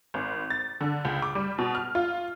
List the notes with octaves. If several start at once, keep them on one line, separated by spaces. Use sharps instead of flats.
G#1
A6
D3
C#2
D6
G3
B2
F6
F4